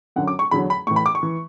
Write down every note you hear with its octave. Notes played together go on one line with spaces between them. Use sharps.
F#2 D3 F#3 F#5
D6
C#6
E2 D3 F#3 B5
B5
A2 E3 C#6
B5
D6
C#6
E3